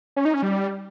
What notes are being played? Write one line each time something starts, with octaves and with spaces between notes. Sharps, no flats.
C#4
D#4
C#4
G3